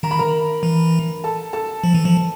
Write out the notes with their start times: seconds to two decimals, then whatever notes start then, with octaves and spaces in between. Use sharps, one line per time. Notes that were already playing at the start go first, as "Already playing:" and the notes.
0.03 D#3 A#5
0.11 B5
0.19 A#4 A#5
0.63 E3
1.24 A4 A5
1.53 A4 A5
1.84 F3
1.94 E3
2.05 F3